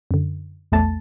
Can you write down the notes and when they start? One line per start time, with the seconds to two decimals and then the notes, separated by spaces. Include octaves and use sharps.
0.11 F#2 D3
0.72 A#1 E2 A3 A5 A6